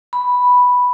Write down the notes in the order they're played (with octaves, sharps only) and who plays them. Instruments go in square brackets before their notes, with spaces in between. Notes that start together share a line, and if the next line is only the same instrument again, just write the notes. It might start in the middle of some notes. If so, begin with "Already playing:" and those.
[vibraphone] B5